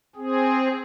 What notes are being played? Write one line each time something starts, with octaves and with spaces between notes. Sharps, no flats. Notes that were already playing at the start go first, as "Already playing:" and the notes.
C4 G#4